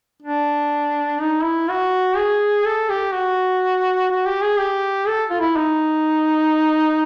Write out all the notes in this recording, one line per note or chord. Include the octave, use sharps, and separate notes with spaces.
D4
D#4
E4
F#4
G#4
A4
G4
F#4
F#4
G4
G#4
G4
A4
F4
E4
D#4